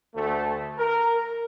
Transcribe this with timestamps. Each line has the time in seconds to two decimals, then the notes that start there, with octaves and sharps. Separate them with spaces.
0.15 D2 A3
0.78 A#4